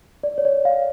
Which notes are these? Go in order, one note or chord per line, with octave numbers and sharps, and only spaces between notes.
D5
C#5
D5
F5